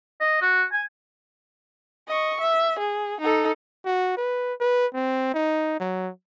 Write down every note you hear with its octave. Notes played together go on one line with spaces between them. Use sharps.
D#5
F#4
G#5
D#5 C#6
E5
G#4
D#4 A4
F#4
B4
B4
C4
D#4
F#3